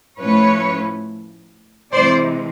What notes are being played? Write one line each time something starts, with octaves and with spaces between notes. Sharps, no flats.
A2 F3 A3 C#4 B4 C#5
C3 E3 G#3 C5 D5